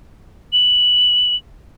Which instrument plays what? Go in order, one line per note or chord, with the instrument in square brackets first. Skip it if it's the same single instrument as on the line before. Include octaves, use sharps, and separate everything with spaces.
[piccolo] F#7